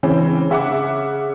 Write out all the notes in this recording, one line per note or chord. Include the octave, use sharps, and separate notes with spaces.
C#3 E3 C4 C#4
C#3 E5 F#5 D6